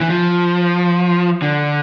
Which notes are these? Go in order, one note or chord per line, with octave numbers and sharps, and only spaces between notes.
E3
F3
D3